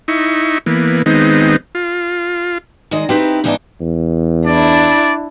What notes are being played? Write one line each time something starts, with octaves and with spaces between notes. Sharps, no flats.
D#4 E4 C#6
E3 A#3 B3
D#3 G#3 B3 C4 D#4
F4
D#3 G#3 D#5
C4 D#4 E4 G4 B4
G#2 E3 B3 D4 D#4
E2
D4 E4 D5